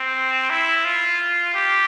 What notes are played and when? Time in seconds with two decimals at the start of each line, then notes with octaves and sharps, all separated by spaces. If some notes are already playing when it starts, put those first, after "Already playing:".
Already playing: C4
0.50 E4
0.85 F4
1.54 G4